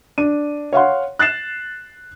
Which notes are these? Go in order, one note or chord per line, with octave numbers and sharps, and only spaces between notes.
D4 D#7
C#5 F5 F#5 C6
F#6 A6 C7 E7